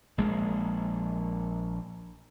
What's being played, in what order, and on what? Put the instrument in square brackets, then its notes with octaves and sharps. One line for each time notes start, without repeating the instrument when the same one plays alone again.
[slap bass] A#1 G#3 A#3